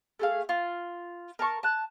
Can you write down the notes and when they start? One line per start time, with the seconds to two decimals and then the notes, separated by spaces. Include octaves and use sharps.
0.19 A3 G#4 F5
0.49 F4
1.39 A#4 A5 C#6
1.63 A5 F#6